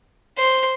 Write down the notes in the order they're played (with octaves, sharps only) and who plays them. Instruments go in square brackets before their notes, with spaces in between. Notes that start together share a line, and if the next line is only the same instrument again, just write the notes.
[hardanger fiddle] C5